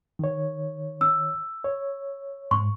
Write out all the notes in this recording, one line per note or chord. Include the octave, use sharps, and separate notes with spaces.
D#3 C#5
E6
C#5
G#2 C6 C#6